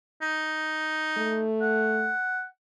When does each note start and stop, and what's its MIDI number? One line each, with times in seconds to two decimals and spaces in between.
0.22 1.44 63
1.17 2.11 57
1.62 2.45 78